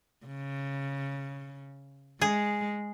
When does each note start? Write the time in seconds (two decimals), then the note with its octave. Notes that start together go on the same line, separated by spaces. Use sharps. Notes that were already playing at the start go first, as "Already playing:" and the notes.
0.26 C#3
2.21 G#3 G#4